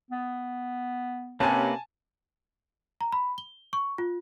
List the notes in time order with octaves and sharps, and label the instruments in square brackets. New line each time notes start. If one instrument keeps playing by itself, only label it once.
[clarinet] B3
[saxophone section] C3 C#4 [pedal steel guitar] A#3 B4 [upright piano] G#5 A5
[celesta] A#5
B5
G7
C#6
F4